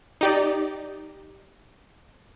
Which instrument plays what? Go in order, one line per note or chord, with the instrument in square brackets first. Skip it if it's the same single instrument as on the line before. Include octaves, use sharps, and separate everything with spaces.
[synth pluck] D#4 G4 D5